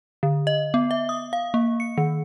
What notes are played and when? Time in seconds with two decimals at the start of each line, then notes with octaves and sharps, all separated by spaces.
0.23 D3
0.47 D#5
0.74 B3
0.91 E5
1.09 D#6
1.33 F5
1.54 A#3
1.80 C#7
1.98 D#3